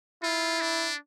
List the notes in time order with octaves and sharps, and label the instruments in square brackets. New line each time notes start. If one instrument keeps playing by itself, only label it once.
[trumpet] E4 [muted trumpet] F4
[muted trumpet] D4